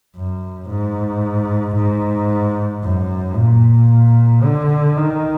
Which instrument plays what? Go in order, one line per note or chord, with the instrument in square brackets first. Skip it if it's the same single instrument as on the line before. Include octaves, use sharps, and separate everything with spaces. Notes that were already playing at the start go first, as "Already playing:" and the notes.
[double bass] F#2
G#2
G#2
F#2
A#2
D3
D#3